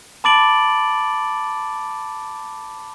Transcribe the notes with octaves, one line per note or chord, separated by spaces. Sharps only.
A5 B5 D6 A6 D7 F#7